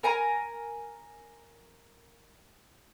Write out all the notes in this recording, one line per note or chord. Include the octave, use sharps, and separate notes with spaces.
A#4 G#5 A#5